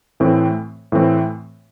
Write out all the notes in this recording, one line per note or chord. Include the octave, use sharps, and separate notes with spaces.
A2 E3 A3 C4
A2 E3 A3 C4